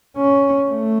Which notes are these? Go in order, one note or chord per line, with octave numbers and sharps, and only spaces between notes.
C#4
A3